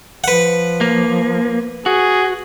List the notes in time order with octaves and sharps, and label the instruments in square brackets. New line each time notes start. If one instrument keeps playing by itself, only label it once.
[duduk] F3 [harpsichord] B4 F#5
[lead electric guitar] A#3
[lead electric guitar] F#4 [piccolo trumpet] G#4